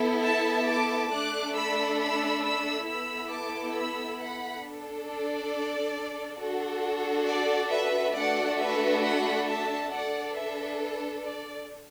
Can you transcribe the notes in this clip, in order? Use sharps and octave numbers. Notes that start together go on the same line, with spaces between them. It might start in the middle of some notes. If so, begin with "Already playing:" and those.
Already playing: B3 E4 A4
E5 A5
A5 D6
A3 D4 A4 D6 F#6
B5 E6
B5 E6
B5 E6
B3 E4 A4 B5 E6
A5 D6
B5 E6
F#5 B5
D4 A4
D5
D4 F#4 A4
D5
B4 E5
A3 D4 F#4 A4 D5 F#5
B4 E5
F#5 B5
E5 A5
D4 A4 D5 F#5
B4 E5
B4
D5